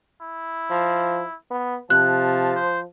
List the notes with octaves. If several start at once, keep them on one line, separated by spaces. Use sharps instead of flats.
E4
F3
B3
C3 F3 A5 F#6
C5